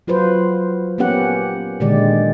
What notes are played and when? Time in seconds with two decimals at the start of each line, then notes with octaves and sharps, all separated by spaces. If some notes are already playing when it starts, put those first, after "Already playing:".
0.07 F#3 F4 F#4 B4 C5
0.98 A#3 B3 C#4 G4 F#5
1.80 A#2 D3 D#3 G#3 G4 D5